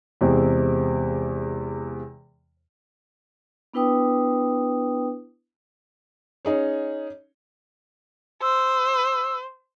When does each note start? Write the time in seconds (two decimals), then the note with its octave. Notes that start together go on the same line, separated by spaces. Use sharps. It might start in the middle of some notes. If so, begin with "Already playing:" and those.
0.21 E2 C3 G#3 C4
3.73 B3 D4 E4 B4 G5 D#6
6.45 C#4 D#4 G#4 C#5
8.42 C5 E6